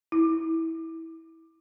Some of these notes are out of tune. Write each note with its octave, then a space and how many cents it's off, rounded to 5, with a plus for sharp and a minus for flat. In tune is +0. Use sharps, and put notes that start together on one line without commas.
E4 -20